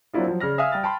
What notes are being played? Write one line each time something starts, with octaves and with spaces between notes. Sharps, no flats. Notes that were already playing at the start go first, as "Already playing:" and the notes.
F#3 A#3 C4 D4 E4 F4
F3 F#3
C#3 D5 F6 A#6
E5 F5 G#5 D#6 F6
G3 G5 F6 A6
G5 A5 B5 C6